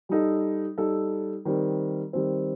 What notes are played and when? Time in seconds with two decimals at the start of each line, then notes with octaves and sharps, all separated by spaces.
0.09 G3 D#4 A4
0.78 G3 D#4 A4
1.45 D#3 G3 C4
2.13 D#3 G3 C4